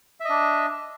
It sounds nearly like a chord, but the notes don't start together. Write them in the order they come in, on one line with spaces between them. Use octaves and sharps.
E5 D#5 D4